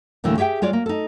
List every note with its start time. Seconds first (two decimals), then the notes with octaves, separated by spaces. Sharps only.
0.24 D2 A2 D3 E3 A3 A#3
0.38 G4 G#4 E5 F5 G5
0.62 G#3 F4 C#5 D5
0.73 A#3
0.86 D#4 A4